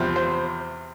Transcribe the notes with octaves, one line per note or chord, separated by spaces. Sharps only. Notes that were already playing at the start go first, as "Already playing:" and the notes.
Already playing: E2 C3 F3 C4
C5